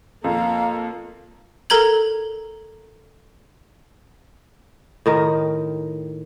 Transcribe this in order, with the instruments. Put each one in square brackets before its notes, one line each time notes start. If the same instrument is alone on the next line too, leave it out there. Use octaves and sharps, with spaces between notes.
[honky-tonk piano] F2 [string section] A#3 [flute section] F5 A#5
[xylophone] A4 A#4 A#5 G#6 F#7
[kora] A2 D#3 A#4